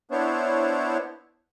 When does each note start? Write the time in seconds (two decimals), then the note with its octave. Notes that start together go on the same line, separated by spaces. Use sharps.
0.11 B3 D4 E4 C5 C#5